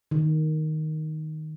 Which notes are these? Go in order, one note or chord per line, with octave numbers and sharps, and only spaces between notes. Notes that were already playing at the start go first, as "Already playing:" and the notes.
D#3